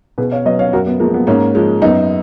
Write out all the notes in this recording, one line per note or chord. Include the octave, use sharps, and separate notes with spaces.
B2 G#4 B4
C#5 F5
F#3 B4 D#5
C#5 F5
F#2 F#4 A#4
B3
F3 G#3 A#3
B3
G#2 A#3 C#4
F3 G#3
F#2 B3 D#4